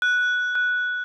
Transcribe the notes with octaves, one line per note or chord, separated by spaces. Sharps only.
F#6
F#6